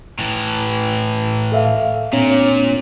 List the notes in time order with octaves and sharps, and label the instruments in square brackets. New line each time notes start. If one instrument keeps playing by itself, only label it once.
[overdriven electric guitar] A2 E3
[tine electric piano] A4 E5 F5
[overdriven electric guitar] A#2 [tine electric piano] C4 D4 C#5